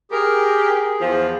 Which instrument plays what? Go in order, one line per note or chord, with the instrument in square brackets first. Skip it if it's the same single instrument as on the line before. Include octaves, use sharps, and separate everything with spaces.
[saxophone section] G4 A#4 [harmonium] G#4
[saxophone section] E2 F3